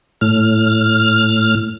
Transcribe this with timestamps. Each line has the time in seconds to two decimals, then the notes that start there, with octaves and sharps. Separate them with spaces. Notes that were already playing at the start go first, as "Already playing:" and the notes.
0.21 A2 F6